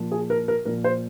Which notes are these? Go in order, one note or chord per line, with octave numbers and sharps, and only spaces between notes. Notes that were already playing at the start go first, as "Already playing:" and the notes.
Already playing: A#2 F3
G#4
A#4
A#4
A#2 F3 A#4
C5